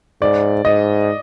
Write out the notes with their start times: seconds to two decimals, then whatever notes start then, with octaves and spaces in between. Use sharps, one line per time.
0.21 G#2 D5
0.65 G#2 D#5